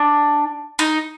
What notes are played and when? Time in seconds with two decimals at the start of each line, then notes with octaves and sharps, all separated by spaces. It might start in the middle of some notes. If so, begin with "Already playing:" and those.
Already playing: D4
0.79 D#4